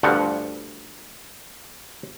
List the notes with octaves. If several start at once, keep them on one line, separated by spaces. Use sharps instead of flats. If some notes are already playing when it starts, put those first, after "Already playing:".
D2 G2 F3 F#5